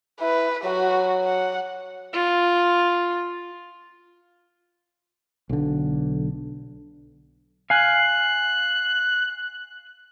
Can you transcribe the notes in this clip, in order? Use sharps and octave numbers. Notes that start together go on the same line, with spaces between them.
E4 B4
F#3 F#4
F#5
F4
B1 D3
F5 G#5 F#6